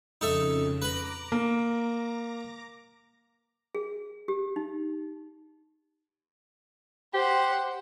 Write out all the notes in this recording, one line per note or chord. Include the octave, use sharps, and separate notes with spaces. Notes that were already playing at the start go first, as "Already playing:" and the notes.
F2 C#3 D#4 A4 E5
B4 A#5 B5 D6 A#6
A#3
G#4
G4
D#4
G4 C5 F#5